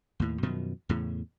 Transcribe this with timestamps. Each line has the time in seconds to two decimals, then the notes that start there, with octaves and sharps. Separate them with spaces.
0.20 D#2 A2
0.43 F#2 B2 D#3 F3
0.89 E2 A2 C#3